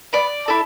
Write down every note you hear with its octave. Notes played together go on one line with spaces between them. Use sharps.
B3 D5
E4 A4